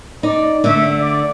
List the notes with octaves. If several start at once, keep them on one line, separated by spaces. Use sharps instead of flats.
D#4 D5
D3 A3 E5
D5